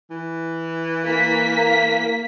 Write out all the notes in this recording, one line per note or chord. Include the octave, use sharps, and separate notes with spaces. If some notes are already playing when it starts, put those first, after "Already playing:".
E3
A#3 B6